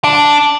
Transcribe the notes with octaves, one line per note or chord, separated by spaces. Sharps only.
D4